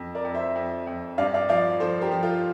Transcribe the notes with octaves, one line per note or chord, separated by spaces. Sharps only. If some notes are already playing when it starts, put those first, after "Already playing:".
Already playing: F2
A#4 D5
F2
C5 E5
F2
F2
G2 D5 F5
D5 F5
F3 D5 F5
F3 A4 C5
G4 A#4
F3
F4 A4